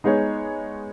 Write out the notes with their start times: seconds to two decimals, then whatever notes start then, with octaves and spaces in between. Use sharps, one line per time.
0.04 G#3 B3 D#4 G#4 C#5